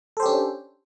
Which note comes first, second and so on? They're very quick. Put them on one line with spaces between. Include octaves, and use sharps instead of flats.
A4 C5 G4 C#4 D4